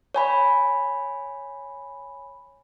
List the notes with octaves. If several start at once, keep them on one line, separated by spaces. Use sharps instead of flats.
C#5 G#5 B5